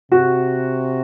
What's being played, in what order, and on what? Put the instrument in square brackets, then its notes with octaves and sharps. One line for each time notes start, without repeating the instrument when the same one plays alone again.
[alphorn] C3 [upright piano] F#4